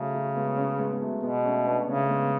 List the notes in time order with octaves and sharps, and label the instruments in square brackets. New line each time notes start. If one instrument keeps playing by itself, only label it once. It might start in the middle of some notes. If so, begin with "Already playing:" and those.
Already playing: [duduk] C#3 [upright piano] F#3 A3
[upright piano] F#3 A3
G#3 B3
A3 C#4
G#3 B3
G#3
F#3 A3
[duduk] B2 [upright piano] G#3 B3
[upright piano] A3 C#4
B3 D4
[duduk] C#3 [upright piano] A3 C#4
[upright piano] G#3 B3